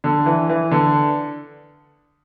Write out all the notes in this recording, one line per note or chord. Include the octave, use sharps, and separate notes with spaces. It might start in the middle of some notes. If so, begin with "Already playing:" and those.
D3
E3
E3
D3